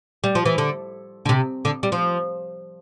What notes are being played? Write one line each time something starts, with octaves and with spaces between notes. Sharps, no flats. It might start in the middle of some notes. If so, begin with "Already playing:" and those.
G3
F3
E3
D3
D3
C3
D3
G3
F3